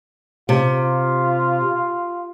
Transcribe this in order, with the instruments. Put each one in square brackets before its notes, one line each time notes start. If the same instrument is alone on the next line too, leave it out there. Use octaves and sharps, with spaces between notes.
[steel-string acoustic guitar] C3 [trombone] F4